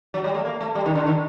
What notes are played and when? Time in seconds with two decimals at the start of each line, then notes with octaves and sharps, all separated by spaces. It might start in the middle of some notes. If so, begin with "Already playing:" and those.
0.14 F#3
0.24 G3
0.34 A3
0.45 A#3
0.60 A3
0.75 G3
0.86 D#3
0.95 D3
1.06 D#3